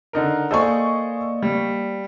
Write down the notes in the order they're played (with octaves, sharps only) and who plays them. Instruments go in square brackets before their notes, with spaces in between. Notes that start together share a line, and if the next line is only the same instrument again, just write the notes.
[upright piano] D3 D#4 A#4
[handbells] A#3 C5 D5 [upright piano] G#4 A4 [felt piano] D#5 C#6
[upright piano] G3